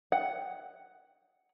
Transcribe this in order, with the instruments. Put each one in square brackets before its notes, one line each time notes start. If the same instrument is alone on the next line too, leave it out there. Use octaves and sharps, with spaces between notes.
[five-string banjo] F#5